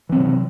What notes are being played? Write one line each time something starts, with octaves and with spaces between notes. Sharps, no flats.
C3 E3 F#3 C4